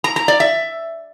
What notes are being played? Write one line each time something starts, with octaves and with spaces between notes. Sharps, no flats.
A#5
A#5
D5
E5